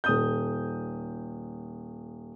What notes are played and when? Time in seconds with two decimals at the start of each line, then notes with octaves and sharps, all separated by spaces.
0.04 D#1 D#6 G6